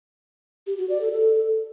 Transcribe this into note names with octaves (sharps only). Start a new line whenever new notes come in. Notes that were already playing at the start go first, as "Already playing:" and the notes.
G4
F#4
D5
A4
A4